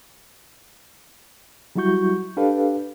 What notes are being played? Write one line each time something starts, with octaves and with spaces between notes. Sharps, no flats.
F#3 G3 E4 F#4 C#6 G6
D4 G4 A4 B4 F5